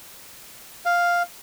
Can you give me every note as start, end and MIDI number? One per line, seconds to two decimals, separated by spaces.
0.86 1.23 77